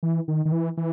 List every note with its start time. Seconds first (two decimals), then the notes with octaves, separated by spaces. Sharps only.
0.03 E3
0.28 D#3
0.45 D#3
0.52 E3
0.77 E3